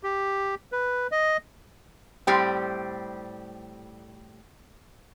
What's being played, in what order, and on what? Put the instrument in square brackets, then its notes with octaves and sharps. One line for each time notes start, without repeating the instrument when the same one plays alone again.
[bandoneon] G4
B4
D#5
[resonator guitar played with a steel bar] A2 G3 C4 G4